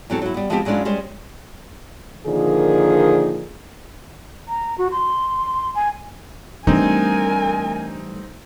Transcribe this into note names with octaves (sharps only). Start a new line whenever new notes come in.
E2 F#3 C4 A4
F#3 E4
G3 B3
F3 G#3 B3 C4 D#4 G4
F#3 G#3 C#4 D4 E4 F4
G3 G#3 C#4 C5
A#2 D3 D#3 F3 G#4
A#5
F#4
C6
G#5
E3 G3 A3 C4 D4 D#4 A#4 G#5